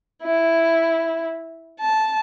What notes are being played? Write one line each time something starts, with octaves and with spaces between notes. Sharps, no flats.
E4
A5